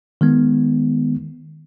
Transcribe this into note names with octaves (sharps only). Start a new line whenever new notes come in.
D#3 G#3 B3